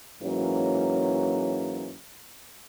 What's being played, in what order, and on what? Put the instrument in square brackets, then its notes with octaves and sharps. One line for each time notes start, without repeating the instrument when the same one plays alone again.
[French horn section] G#2 E3 F#3 A#3 C#4